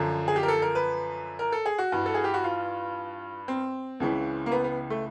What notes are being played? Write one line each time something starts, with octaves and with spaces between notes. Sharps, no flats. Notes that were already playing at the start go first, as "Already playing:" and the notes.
Already playing: F#2 D3 F3
G#4
G4
A#4
A4
A#4
B4
A#4
A4
G#4
F#4
G2 E3
A4
G#4
G4
F#4
F4
C4
C#2 C#3 E3
A#3
B3
B3
A3